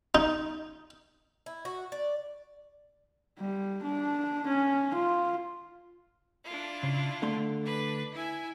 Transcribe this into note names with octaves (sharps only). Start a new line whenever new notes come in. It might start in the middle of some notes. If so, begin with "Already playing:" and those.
D#4
E4
F#4
D5
G3
D4
C#4
F4
D4 E4 F4
C#3
D3 A3 C6
D4 B4
E4 E5 G#5